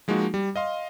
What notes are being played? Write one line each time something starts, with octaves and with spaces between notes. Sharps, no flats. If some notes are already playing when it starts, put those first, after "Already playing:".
F3 G#3 A#3 D#4 F#4
G3
D#5 F5 C6